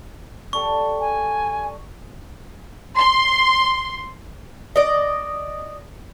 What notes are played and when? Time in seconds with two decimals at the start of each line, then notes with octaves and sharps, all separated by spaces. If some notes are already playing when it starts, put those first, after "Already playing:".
0.53 G4 A4 D5 C#6
1.00 G#5
2.97 C6
4.76 D5 D#5